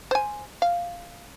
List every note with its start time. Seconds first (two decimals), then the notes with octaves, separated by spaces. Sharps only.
0.11 C5 G#5
0.62 F5